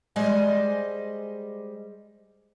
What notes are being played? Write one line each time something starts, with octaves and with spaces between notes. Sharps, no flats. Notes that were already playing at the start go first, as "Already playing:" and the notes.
G3 G#3 C5 D5 D#5 G#5